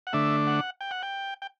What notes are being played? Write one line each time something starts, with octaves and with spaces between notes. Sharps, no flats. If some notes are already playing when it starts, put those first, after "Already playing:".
F#5
D3 A3 D4 E5
F#5
G5
F#5
G5
G5